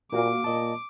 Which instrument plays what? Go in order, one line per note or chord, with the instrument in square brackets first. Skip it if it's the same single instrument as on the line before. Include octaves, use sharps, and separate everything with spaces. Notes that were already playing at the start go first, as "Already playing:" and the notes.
[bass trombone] A#2 [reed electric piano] A#3 F#4 F5 [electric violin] D6
[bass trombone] A#2 [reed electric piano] D#5 A5